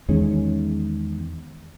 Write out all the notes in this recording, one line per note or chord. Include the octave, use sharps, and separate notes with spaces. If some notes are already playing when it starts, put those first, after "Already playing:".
E2 D#3 G#3 C#4